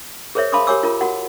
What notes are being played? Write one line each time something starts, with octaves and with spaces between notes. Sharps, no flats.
G#4 A#4 C5 C#5 E5
F5 A5 B5 C6 D6 D#6
G4 A#4 C#5 G#5 D6 E6
F4 A#4
F#4 A#4 F#5